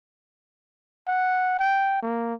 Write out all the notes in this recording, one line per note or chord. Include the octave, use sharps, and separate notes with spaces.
F#5
G5
A#3